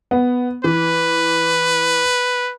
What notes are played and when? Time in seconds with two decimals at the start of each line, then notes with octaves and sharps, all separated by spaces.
0.11 B3
0.64 E3 B4